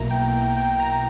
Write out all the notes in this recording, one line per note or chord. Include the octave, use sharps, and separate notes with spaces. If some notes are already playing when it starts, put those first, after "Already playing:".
Already playing: B1 B2 A#3 E4 A#5
G5
G5
G5
A#5